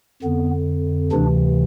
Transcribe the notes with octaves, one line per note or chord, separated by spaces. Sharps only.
F2 D3 B3
D2 C3 E3 D4